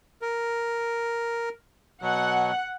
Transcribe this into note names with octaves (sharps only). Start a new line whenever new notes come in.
A#4
B2 F#3 F#5